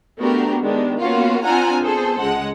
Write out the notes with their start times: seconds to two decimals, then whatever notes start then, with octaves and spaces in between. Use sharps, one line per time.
0.19 A3 B3 D4 F#4 G4 A#4
0.61 D#3 G#3 B3 D4 G4
1.00 A#3 B3 C#4 F4 F#4
1.44 C4 D4 F4 F#5 G#5 A#5
1.82 B3 G#4 A4 C5
2.20 C#2 G#3 F#5